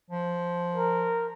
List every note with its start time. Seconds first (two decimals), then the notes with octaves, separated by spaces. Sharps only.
0.10 F3
0.75 A#4